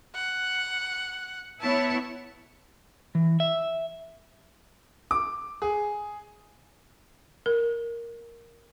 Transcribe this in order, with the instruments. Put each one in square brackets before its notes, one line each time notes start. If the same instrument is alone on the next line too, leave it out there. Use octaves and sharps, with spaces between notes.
[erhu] F#5
[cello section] B3 E4 C#5 [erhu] A5
[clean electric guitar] E3
E5
[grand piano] D6
G#4
[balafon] A#4